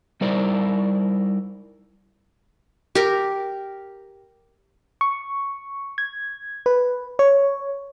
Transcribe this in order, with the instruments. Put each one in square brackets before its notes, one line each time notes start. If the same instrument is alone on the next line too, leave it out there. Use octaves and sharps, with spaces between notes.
[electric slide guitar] G3 D#4 E4 A#4 C5 D5
[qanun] G4 A#4
[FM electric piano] C#6
G#6
B4
C#5